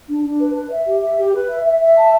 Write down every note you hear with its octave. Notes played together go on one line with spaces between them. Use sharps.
D4
D4
B4
B4
E5
G4
E5
G4
B4
E5
E5
E5
A5